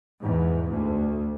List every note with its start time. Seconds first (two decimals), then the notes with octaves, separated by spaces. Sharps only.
0.22 E2 G#2
0.70 D2